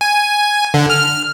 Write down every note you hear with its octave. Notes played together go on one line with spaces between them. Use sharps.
G#5
D3
F6